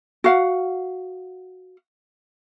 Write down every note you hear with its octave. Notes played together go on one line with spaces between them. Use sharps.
F#4 F5 F#5